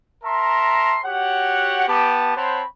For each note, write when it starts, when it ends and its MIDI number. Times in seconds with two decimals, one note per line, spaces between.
0.24 0.98 70
0.24 0.98 76
0.24 0.98 81
0.24 0.98 82
0.24 0.98 84
1.05 1.84 66
1.05 1.84 67
1.05 1.84 73
1.05 1.84 78
1.88 2.36 59
1.88 2.36 67
1.88 2.36 81
2.36 2.61 60
2.36 2.61 72
2.36 2.61 73
2.36 2.61 78
2.36 2.61 81
2.36 2.61 83